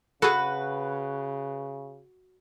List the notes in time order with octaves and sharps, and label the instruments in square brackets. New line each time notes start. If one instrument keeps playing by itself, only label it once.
[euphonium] C#3 [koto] F#4 [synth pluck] G#4 A4 [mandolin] B4